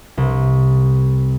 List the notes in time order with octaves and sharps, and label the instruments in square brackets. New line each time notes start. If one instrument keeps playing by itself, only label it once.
[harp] C2